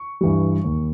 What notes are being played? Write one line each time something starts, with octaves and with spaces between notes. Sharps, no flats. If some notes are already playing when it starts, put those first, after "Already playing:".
Already playing: C#6
G2 E3 G3
D#2